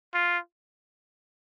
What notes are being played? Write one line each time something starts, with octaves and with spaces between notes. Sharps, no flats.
F4